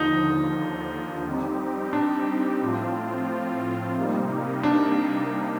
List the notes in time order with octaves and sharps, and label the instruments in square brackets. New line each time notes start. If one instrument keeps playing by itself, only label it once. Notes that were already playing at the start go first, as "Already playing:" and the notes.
Already playing: [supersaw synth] D#2 D3 F3 [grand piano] D#4
[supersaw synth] G3 C4 D#4 G4
[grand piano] D4
[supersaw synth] A2 F3 C4 F4
C3 G3 A#3 D#4
[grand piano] D4